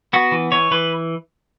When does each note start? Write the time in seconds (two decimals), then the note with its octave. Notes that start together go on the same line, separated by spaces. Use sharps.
0.13 B3 F#4
0.32 E3
0.52 E3 C#5
0.71 E3 B4